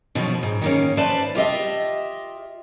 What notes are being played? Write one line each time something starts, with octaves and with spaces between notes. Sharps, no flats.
B2 D#3 F3 F#3
G#2
D#3 A#3 C#4
B4 C5 D5 E5 A5
F4 G4 D#5 E5